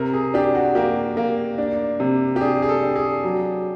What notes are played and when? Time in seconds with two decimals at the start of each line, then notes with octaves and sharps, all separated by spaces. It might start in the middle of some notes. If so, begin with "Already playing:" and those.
Already playing: C3 A#4
0.13 G#4
0.34 D4 G4
0.55 F#4
0.75 A#3 G4
1.17 A#3
1.58 D4
2.00 C3
2.36 G4
2.41 D4 G#4
2.62 G#4
2.69 A4
2.83 D4
2.96 G#4
3.24 F#3